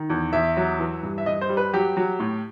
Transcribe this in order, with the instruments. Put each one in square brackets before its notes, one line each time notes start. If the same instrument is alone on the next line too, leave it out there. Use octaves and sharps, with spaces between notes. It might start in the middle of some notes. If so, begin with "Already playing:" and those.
Already playing: [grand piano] D#3
E2
E2 E5
F#3
E3
G2
E5
G2 D#5
C5
G3
B4
F#3 G4
F#3
A2